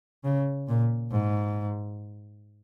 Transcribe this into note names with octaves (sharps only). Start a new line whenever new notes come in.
C#3
A#2
G#2